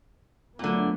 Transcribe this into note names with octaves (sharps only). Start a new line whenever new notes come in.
A#2 D3 F#3 A3 B3